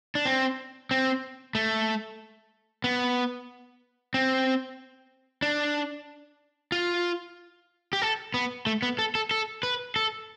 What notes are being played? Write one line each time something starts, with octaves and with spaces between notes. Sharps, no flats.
D4
C4
C4
A3
B3
C4
D4
F4
G4
A4
B3
A3
B3
A4
A4
A4
B4
A4